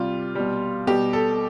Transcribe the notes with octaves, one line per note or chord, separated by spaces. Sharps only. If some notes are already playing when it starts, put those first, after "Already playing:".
Already playing: C3 G3 F4
B2 G3
B2 G3 G4
A4